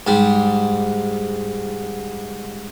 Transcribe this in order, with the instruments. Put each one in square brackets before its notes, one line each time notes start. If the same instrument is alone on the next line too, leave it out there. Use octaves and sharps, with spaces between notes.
[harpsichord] G#2 G3